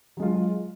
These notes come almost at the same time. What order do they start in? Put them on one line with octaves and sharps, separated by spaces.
F#3 G#3 F4